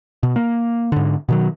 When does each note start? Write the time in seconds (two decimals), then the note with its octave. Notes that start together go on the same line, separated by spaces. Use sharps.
0.23 B2
0.36 A#3
0.92 G#2 D3
1.29 B2 D#3 F#3